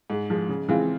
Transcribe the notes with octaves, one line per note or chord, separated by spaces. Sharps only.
G#2
F3 G#3
C#3
E3 G#3 C4 F4